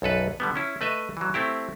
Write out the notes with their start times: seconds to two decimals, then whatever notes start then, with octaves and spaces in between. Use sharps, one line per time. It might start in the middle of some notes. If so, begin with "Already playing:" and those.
0.02 B1 F#2 A4 B4
0.40 D3 G3 B3
0.56 C#4 E4
0.81 A3 B4 D#5 E5
1.17 E3 F#3
1.34 A3 C4 E4 G4